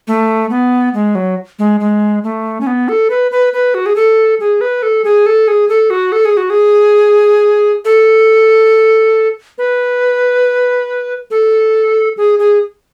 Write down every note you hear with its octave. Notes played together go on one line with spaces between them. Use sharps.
A3
B3
G#3
F#3
G#3
G#3
A3
C#4
B3
A4
B4
B4
B4
F#4
G#4
A4
G#4
B4
A4
G#4
A4
G#4
A4
F#4
A4
G#4
F#4
G#4
A4
B4
A4
G#4
G#4